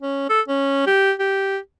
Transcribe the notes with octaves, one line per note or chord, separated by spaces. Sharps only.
C#4
A4
C#4
G4
G4